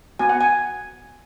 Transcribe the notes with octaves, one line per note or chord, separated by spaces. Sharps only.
B3 F#4 G#5
F#5
G#5